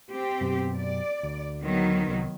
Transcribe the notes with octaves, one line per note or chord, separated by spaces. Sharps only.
C4 G4
F#2 B2
D5
D2
D#3 F#3 B3
C2